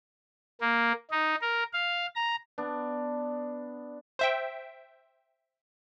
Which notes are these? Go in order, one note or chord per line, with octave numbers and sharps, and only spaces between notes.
A#3
D#4
A#4
F5
A#5
B3 D4
C5 E5 G5